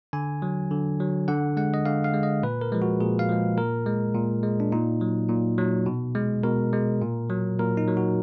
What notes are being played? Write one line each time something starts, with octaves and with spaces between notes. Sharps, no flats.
D3 G#5
F#3
D3
F#3
D3 F#5
G#3 F#5
D#5
D3 F5
F5
G#3
D#5
A#2 B4
A#4
F3 G#3
F#4
A#2 G#4
F5
F3 G#3
A#2 A#4
G#3
A#2
G#3
D4
A#2 D#4
F#3
A#2
F#3
B2
G#3
B2 A#4
G#3
A#2
F#3
A#2 A#4
D#4
F#3
F#4